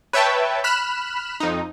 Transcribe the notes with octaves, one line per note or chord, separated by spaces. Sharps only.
B4 C#5 E5 G5 A5
B5 F6 F#6 E7
F2 D#4